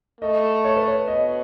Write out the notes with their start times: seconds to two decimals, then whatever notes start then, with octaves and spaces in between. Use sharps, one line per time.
0.21 A3 D#5
0.65 C#5
0.76 B4
0.88 C#5
1.08 B2 D#5